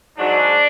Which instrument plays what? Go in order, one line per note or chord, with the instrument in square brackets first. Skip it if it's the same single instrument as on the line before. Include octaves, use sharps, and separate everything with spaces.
[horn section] G#2 F#3 D4